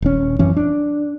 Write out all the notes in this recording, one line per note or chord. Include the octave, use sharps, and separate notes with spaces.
D#1 C#4
F#2 E3 C#4
D4